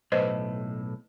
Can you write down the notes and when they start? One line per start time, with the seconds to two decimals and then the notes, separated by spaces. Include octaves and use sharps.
0.12 B1 A2 B4 C5 D#5